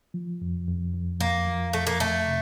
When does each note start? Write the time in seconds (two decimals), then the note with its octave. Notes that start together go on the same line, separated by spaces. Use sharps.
0.14 F3
0.41 F2
0.68 F2
0.94 F2
1.20 F2 A#3
1.47 F3
1.73 F2 A3
1.87 A#3
2.00 F2 A3
2.27 C3